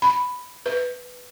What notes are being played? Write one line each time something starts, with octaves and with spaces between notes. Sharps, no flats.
B5
B4